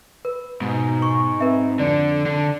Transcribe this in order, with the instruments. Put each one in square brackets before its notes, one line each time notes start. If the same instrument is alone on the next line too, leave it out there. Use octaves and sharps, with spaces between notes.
[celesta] B4
[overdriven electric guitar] G#2 [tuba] B2
[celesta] C#6
[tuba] C4 [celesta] B4 E5
[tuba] F2 [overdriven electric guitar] D3 [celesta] D5
[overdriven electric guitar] D3